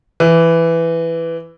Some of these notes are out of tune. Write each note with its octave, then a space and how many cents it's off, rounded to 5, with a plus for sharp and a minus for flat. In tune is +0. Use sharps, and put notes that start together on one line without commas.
E3 +10